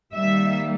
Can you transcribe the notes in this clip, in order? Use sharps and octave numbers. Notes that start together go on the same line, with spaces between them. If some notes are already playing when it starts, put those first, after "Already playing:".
D#3 G3 A#3 E5